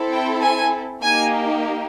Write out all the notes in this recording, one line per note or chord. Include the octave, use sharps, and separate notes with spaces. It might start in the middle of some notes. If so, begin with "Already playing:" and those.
Already playing: C4 E4 A4
G5
G#5
A#3 D#4 G4 G#5